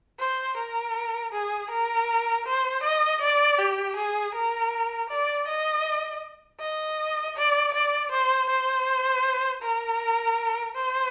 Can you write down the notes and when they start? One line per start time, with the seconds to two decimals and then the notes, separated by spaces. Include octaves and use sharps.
0.19 C5
0.57 A#4
1.32 G#4
1.71 A#4
2.46 C5
2.83 D#5
3.21 D5
3.58 G4
3.96 G#4
4.34 A#4
5.10 D5
5.48 D#5
6.60 D#5
7.36 D5
7.74 D5
8.11 C5
8.49 C5
9.62 A#4
10.75 C5